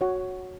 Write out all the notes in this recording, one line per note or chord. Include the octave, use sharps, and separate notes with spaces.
F#4 C#5 F#5